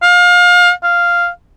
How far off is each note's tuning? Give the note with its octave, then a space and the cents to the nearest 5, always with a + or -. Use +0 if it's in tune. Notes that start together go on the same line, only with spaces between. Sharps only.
F5 +30
F5 -5